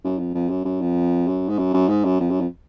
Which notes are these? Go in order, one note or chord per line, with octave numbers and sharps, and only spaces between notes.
F#2
F2
F2
F#2
F#2
F2
F#2
G#2
F#2
F#2
G#2
F#2
F2
F#2
F2